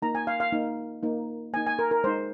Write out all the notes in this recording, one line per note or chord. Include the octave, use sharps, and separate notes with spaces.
A#3 D#4 A#5
G#5
F5
F5
A#3 D#4
A#3 D#4
A#3 D#4 G#5
G#5
A#4
A#4
G#3 D#4 C5